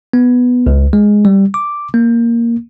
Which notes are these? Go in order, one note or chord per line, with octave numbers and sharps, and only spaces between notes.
B3
C#2
G#3
G3
D6
A#3